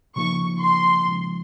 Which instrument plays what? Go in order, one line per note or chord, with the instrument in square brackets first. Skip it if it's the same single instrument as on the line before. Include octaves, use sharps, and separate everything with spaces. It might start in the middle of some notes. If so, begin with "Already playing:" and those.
[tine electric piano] C#3 F3 A#3 D#4 [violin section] C#6
[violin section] C6
[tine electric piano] C#3 F3 G#3 C#4